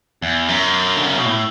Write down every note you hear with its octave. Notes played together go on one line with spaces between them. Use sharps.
E2
F#2
D3
C#3
B2
A2